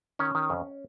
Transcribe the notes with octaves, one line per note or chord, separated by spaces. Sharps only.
D#3 C#4
D#3
F2